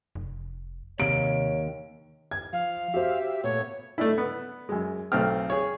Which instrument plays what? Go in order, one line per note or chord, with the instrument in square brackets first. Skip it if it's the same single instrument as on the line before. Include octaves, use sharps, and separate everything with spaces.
[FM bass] F1
[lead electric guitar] D#2 [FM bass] C3 [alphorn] C#5 [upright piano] D7
[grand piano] G#6
[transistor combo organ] F3 [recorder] F5
[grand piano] F#4 C5 [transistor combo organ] G4 E5
[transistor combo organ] A#2 A3 B3 [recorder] C#5
[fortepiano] A3 D4 E4
B3
F#2 G#3
B1 A3 C4 F6
G#4 C#5